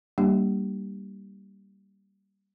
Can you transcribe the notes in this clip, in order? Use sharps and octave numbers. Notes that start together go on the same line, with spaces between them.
G3 A#3 D4 G4